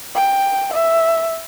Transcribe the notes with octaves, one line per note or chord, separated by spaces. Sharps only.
G5
E5